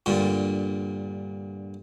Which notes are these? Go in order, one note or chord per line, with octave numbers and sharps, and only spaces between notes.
G2 A#2 D3